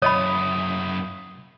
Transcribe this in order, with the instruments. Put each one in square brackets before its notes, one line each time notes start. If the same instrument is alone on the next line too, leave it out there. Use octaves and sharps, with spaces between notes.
[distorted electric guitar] F#2 E4 [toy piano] C#5 D#5 B5 [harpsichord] D#6